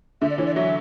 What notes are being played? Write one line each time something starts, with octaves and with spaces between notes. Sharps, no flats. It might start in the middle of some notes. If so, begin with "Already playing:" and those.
D3 E5
D5
E3 C#5
D5
F#3 E5